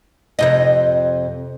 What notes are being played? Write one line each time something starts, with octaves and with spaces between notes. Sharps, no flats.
F2 C3 D#5